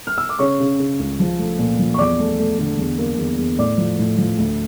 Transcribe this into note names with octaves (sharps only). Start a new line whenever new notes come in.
F6
E6
D6
C#3 C#5 C#6
C#3
C#3
C#2
F3
A3
A#2
F3
C#6
E2 D5 D6
A3
A3
D3
E2
A#3
E2
E2
A2 D5 D6
F3
A2
F3
D2